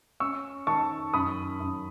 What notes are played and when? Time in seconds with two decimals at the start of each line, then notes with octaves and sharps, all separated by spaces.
0.20 C#4 C#6 E6
0.67 D#3 A5 C#6
1.13 F#2 B5 D#6
1.60 F#2